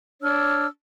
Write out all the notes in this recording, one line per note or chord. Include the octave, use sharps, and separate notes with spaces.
D4 C#5 E6 F6